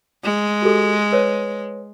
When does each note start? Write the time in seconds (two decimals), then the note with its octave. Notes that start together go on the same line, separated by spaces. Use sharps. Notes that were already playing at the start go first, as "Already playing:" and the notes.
0.24 G#3
0.62 F#4 G4 A4
1.12 B4 C#5